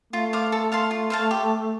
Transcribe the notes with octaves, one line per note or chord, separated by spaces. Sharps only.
A3 F4
C5 F5 D6
A4
F5 A5 C6
F4
C5 F5 A5
G4